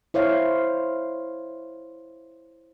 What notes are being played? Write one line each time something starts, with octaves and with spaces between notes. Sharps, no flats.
E4 C5 C#5 F5